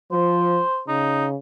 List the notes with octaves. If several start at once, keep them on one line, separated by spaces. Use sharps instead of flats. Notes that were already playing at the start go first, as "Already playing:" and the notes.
F3 C5
C#3 D#4